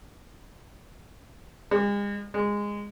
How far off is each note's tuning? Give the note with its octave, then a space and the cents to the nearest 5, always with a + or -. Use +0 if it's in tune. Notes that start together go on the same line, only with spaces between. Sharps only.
G#3 -40
G#3 -15